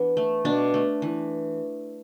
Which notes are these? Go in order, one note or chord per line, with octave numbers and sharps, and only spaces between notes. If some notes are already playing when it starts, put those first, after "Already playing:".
Already playing: E3 B3 D4
A3
B2 D4
A3
E3